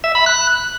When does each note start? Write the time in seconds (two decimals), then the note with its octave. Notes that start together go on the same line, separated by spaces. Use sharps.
0.04 E5
0.15 B5
0.26 F#6